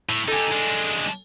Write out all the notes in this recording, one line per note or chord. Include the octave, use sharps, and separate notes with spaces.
A2
D#4 G4 A4 G#5
G#3 D4